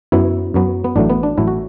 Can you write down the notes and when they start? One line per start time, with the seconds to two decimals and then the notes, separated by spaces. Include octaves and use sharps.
0.12 F#2 F#3 B3 E4
0.54 F#2 F#3 B3
0.84 B3
0.96 A1 A2 F#3 A3 D4
1.10 B3
1.23 D4
1.38 A1 A2 F#3 A3 E4
1.48 F#4